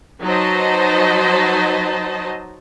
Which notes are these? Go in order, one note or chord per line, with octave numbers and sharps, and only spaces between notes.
F#3 D#4 B4 C5 D#5 A5